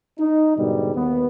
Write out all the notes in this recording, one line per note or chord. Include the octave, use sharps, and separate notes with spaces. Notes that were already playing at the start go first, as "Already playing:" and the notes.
D#4
G#2 B2 D3 G3
D#2 B3